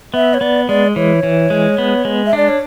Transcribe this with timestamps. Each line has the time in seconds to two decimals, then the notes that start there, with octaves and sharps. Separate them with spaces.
0.14 B3 E5
0.34 C#5
0.41 B3 D5
0.68 G#3 D5
0.96 E3 C#5
1.23 E3
1.50 G#3
1.78 B3
2.05 G#3
2.26 E5
2.33 D4 D5
2.48 C#5